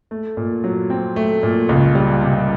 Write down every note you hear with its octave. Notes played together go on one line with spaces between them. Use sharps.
A3
A#2
F#3
C4
A3
A#2
C#2
G3
C3